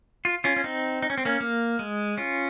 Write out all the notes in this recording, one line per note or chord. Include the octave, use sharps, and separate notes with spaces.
F4
C#4 F4
C#4
C4 D#4
D#4
C#4
C4
A#3 C#4
A#3
G#3
C#4 F4